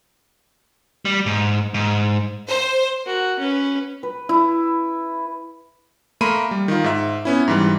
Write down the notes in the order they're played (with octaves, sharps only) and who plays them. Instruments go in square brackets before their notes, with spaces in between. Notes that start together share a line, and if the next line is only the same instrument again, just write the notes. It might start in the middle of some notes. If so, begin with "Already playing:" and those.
[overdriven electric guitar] G3
G#2
G#2
[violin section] C5
[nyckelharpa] F#4 A#4
C#4 B4
[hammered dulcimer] B4
E4
[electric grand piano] A3 A#3 A#4 B5 C6 D#7
G3
D#3 F4
G#2 E5
B3 C#4 E4
G#2 E3 G3